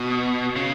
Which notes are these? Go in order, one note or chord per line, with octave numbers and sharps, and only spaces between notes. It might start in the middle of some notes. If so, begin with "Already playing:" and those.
Already playing: B2
C#3